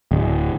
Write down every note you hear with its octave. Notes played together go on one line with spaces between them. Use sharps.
D1